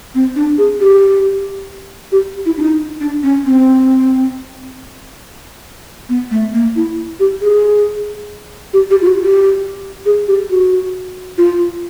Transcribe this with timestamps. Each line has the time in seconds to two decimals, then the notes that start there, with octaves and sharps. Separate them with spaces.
0.15 C4
0.36 D4
0.58 G#4
0.81 G4
2.12 G4
2.46 E4
2.57 D4
2.62 D#4
3.00 D4
3.23 C#4
3.45 C4
6.09 B3
6.31 A3
6.54 A#3
6.76 E4
7.20 G4
7.41 G#4
8.73 G4
8.91 G4
9.02 F4
9.07 F#4
9.23 G4
10.06 G#4
10.28 G4
10.50 F#4
11.38 F4